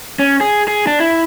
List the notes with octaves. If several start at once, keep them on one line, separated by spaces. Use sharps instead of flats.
C#4
G#4
G#4
D4
E4